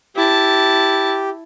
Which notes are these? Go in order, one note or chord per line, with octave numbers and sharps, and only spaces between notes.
E4 G4 A5